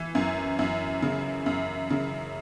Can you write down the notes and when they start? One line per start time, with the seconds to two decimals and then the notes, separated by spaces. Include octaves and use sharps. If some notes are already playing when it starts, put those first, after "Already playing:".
Already playing: E3
0.15 F#2
0.59 F#2
1.02 C#3
1.46 F#2
1.90 C#3